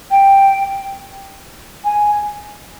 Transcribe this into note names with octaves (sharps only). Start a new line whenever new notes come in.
G5
G#5